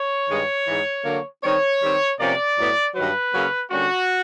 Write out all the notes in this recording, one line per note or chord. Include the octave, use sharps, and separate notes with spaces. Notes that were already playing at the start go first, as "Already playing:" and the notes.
Already playing: C#5
G2 D#3 G#3
G#2 E3 G#3
D3 F#3 A#3
D#3 G3 C4 C#5
D#3 G3 C4
C3 F3 A#3 C#4 D5
A2 F#3 B3
G2 D#3 F#3 B4
C#3 F#3 A#3 C#4
D3 G3 A#3 C#4 F#4